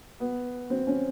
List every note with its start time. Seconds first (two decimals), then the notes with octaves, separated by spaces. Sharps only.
0.20 B3
0.70 C4
0.87 C#4